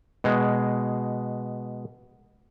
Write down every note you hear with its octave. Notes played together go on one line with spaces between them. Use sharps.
B2 G#3